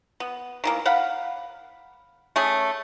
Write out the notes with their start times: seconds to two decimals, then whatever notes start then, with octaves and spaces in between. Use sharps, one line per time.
0.20 B3
0.64 D#3 E3 A#3
0.85 F5 F#5 B5
2.36 A3 C#4 G#4